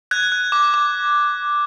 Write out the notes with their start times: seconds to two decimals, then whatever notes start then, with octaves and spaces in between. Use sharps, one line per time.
0.11 F#6 G#6
0.32 F#6
0.52 D6
0.74 D6